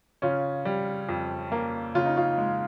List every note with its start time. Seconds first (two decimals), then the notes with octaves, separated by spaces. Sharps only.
0.22 C#3 C#4 F4
0.65 G3
1.09 F2
1.52 A#3
1.95 C#3 F4
2.05 D#4
2.16 C#4 F4
2.38 G#3